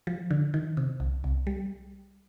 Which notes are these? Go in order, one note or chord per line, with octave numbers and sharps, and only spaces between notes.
F3
D3
D#3
C3
C2
C2
G3